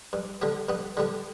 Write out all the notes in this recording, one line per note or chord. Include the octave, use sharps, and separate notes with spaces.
G2
D3 G3 B3
G2 B3
D3 G3 B3